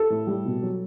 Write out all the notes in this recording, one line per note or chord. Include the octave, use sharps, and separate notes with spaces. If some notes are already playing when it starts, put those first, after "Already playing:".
Already playing: A4
A2
G3
B2
F#3